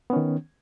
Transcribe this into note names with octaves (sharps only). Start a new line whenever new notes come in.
D#3 B3 C#4